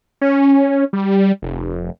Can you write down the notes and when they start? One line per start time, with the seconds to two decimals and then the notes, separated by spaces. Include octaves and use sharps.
0.21 C#4
0.93 G3
1.42 F1